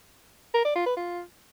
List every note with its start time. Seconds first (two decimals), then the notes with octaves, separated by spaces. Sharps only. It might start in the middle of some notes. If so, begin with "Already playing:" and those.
0.54 A#4
0.65 D5
0.75 F4
0.86 B4
0.96 F4